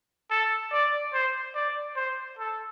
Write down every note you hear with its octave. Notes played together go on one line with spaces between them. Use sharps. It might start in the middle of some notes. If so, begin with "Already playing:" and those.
A4
D5
C5
D5
C5
A4